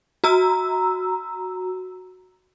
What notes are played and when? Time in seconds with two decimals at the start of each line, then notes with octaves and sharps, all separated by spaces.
0.24 F#4 A#5 E6